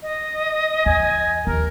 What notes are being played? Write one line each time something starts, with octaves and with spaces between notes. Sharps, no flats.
D#5
E2 G#5
D#2 A#4